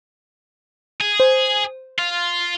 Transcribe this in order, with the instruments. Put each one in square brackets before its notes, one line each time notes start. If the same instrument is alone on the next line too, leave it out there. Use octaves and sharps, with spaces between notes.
[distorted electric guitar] G#4
[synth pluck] C5
[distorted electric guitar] F4